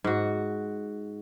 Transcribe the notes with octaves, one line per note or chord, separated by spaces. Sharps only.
G#2 F#4